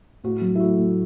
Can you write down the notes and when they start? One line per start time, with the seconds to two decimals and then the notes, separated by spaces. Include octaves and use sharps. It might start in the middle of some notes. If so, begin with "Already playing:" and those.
0.24 A2 F#4
0.41 F#3
0.55 E4
0.60 A3 F#4
0.78 A2